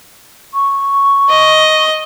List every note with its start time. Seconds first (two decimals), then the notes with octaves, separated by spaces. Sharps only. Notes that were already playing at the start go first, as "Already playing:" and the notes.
0.54 C#6
1.29 D#5